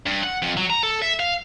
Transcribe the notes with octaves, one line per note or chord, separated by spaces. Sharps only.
G2
F#5
F2
F#3
A#5
A4
E5
F5